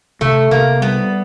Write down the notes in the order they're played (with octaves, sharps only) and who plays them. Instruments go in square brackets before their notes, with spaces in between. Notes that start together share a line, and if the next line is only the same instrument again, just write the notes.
[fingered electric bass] C3 [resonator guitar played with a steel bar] A3
[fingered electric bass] C3 [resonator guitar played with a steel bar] A#3
[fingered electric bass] G3 [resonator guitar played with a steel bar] B3